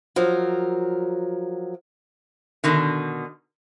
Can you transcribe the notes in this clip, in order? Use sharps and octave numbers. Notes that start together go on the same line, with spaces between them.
F3 F#3 A#4
B2 D3 D#3